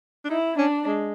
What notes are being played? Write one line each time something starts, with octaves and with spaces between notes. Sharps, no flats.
D4
D#4 E4
C#4 D4
G#3